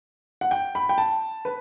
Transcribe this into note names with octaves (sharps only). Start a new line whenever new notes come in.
F#5
G5
B5
G5
A5
B4